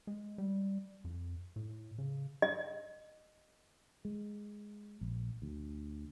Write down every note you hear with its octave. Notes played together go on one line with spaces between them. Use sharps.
G#3
G3
F2
A2
C#3
D#5
G#3
A#1
D2